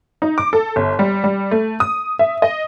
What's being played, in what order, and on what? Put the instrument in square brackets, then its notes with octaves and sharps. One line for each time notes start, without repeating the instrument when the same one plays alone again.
[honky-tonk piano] D#4
D6
A4
G1
G3
G3
A3
D#6
E5
D#5